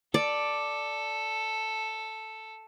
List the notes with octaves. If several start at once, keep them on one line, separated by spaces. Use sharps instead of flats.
A4 D5